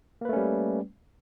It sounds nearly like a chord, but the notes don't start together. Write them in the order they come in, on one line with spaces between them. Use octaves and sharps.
A#3 B4 A3 C#4 G3